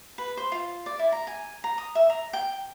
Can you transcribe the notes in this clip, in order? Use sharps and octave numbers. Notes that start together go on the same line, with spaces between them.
B4
C5
F4
D5
E4
A#5
G#5
A#5
D#6
E5
A#5
G5